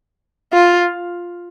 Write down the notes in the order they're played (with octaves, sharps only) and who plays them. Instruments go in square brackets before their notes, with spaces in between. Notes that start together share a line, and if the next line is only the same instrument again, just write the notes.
[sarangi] F4